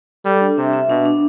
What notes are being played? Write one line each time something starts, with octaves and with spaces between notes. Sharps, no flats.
G3 A4
D4
C3 E5
E5
B2 D4
D4